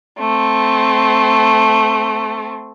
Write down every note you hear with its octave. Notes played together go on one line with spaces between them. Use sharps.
A3 C4